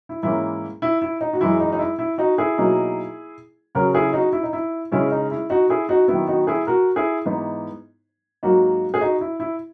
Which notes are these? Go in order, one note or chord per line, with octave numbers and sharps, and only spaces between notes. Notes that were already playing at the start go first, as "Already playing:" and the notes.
E4
G#2 E3 A#3 C#4 E4
E4
E4
D#4
F#4
F#2 E3 G#3 E4
D#4
D#4
E4
E4
D#4 F#4
E4 G#4
B2 F#3 A#3 D#4
C#3 F#3 C#4 F#4 A#4
E4 G#4
D#4 F#4
E4
D#4
E4
C#3 G#3 C#4 E4
D#4
E4
D#4 F#4
E4 G#4
D#4 F#4
D#3 F#3 B3 E4
D#4 F#4
E4 G#4
F#4 A#4
E4 G#4
G#2 E3 B3 D#4
G#2 F#3 A#3 D#4 F#4
G#4
D#4 F#4
E4
E4